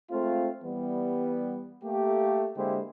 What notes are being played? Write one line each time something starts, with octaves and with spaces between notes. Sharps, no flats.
G#3 A3 C4 F4
E3 G3 B3
A3 A#3 G4
D3 G#3 A#3 E4 G4 C5